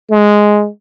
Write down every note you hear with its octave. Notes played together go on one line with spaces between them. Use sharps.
G#3